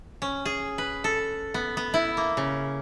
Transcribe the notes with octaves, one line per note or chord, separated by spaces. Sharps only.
C#4
G#4
B4
A4
B3
B3
E4
A#3
C#3